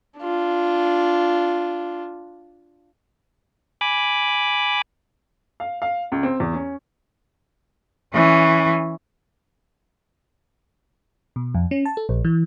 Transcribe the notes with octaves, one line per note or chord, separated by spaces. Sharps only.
D4 F4
G#5 B5 D6
F5
F5
C#2
C4
E2
C#4
E3 C#4
B2
F2
C#4
A5
A4
A#1
E3